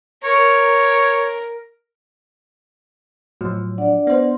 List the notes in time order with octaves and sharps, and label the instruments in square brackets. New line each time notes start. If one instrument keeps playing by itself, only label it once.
[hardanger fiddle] A#4 [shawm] C#5
[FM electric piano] A2 F3 F#3
[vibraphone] D4 D5 F#5
[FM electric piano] B3 C5